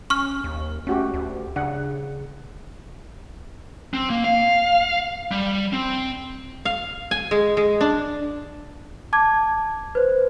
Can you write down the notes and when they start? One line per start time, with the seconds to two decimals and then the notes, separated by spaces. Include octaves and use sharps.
0.10 C#4 C#6 F6
0.44 D#2
0.87 A3 C#4 F#4 G4
1.14 D2
1.56 C#3 D4 F#5
3.94 C4
4.10 A#3
4.24 F5
5.31 G3
5.73 C4
6.65 F5
7.11 G#5
7.31 G#3
7.57 G#3
7.81 D4
9.13 A5 D6 G#6
9.95 B4 C5